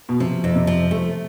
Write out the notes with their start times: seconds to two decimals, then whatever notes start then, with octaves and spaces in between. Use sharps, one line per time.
0.09 B2
0.20 C3 F3
0.44 F2
0.55 C3
0.67 F3
0.91 A3